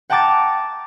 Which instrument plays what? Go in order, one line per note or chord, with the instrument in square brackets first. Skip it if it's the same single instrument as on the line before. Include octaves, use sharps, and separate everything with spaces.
[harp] F#5 G5 A5 A#5 D6 A6